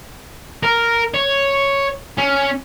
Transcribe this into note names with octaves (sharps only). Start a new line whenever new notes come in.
A#4
C#5
C#4